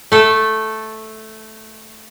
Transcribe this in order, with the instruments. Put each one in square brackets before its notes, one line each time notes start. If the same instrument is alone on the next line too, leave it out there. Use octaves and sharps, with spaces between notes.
[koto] A3 A4